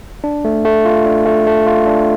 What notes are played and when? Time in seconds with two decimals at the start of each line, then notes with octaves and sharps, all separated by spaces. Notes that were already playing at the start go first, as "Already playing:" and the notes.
0.24 D4
0.45 A3
0.65 A3
0.85 F4
1.06 D4
1.26 A3
1.47 A3
1.66 F4
1.87 D4